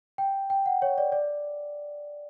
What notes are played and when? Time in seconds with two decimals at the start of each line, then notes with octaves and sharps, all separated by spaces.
0.18 G5
0.50 G5
0.66 F#5
0.82 C#5
0.98 D5
1.12 D5